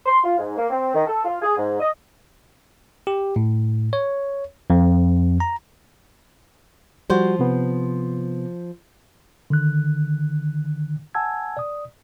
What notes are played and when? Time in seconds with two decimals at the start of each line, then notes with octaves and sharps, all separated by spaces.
0.06 C6
0.24 F4
0.38 G#2
0.56 A#3
0.70 C4
0.94 D#3
1.07 A4
1.25 F4
1.42 G#4
1.57 G#2
1.79 D#5
3.07 G4
3.36 A2
3.93 C#5
4.70 F2
5.40 A#5
7.10 F3 G3 F#4 C5
7.39 C3 B3
9.50 D3 D#3 F#6
11.15 F#5 G#5 A5 E6 G#6
11.57 D5 D#6